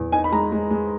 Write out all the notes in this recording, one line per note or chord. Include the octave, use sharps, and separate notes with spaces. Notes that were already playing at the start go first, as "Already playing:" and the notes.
Already playing: E2
D#4 G#5
B5
G#3 A#5
G#3
G#3